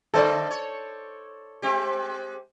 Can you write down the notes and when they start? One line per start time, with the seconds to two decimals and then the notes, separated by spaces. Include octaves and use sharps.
0.14 D3 A3 A4 C5 D5 D#5
0.51 C#5
1.62 G#3 C4 G4